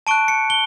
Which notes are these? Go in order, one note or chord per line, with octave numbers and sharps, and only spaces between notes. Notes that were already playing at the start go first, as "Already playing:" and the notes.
A5 C#6 F#6 D7
C#7
G7